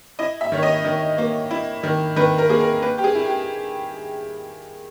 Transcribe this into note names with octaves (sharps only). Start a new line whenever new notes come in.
E4 D#5
E5
D#3 C#5
D#5
D#3
A#3
E4
D#3
D#3 B4
A#4
A#3 G#4
A#4
A#3 B4
G4
G#4
E4
G4